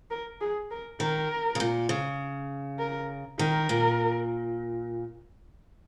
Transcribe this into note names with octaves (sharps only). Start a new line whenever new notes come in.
A#4
G#4
A#4
D#3 A#4
C#3
A#2
C#3
A#4
D#3 A#4
A#2